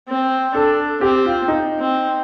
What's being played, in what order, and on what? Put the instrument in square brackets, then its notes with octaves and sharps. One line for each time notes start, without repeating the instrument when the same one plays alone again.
[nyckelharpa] C4
[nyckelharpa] D4 [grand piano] A4
[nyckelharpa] C4 [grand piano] G4
[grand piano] F4
D#4
[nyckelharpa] C4